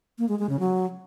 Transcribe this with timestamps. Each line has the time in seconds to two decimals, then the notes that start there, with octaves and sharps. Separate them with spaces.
0.18 A#3
0.29 G#3
0.39 G#3
0.49 C#3
0.60 F#3